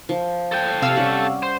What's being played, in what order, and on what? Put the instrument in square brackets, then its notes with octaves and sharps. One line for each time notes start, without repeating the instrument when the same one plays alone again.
[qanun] F3
[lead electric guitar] A4 G5
[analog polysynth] C3 F5 E6
[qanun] G3 C#4 F#5
[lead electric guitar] C5